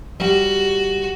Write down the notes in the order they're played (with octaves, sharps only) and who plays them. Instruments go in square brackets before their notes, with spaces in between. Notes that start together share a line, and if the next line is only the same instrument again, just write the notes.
[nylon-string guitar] G3 G4 [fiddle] F#4